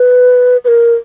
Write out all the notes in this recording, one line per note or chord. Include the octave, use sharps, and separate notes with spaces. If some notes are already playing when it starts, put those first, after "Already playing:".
Already playing: B4
B4
A#4